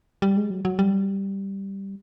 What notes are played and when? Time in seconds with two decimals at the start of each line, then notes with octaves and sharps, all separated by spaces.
0.22 G3
0.37 G#3
0.50 F#3
0.65 F#3
0.79 G3